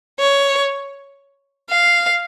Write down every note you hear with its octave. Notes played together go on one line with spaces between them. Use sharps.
C#5
F5